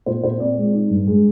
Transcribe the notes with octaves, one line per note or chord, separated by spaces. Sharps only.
A#2 C5
A#2 C5
C4 D5
G#3
D#4
G2
G#3